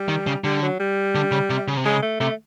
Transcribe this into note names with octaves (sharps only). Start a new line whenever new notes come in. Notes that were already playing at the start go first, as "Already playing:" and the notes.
Already playing: G3
D#3
C#3
D3 G3
F#3
G3
D3
C#3
C3
C#3
C3
C#3 G#3
A3
C3 A3